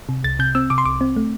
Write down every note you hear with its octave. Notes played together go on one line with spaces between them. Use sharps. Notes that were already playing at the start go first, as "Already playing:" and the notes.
C3
C2 A6
C3 G6
C4 E6
C3 D6
C6
C2 D6
C4
A3